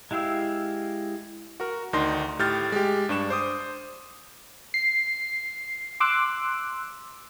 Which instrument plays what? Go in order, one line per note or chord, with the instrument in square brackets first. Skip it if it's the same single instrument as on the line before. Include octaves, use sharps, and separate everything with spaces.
[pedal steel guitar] G#3 E4 G4 F5 E6
[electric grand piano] F#4 A#4
D2 D#3 D4 D#4 C6 A#6
A2 G4 F6 G6 A6
G#3 G4
G2 D4 C#6 E7
C5 D6 D#6
[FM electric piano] C7
C6 D6 E6 F#6